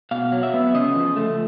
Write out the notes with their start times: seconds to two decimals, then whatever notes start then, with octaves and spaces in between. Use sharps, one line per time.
0.11 B2 F5
0.32 F#3
0.43 E5
0.54 B3
0.74 C#3 D#5
0.95 F3
1.16 A3